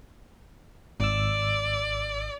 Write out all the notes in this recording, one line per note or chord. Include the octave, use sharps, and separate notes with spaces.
G#1 D5 E6